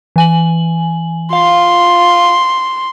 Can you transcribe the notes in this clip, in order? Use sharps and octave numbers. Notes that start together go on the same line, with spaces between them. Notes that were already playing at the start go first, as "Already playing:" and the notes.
E3 G#5 F#7
F4 F5 C6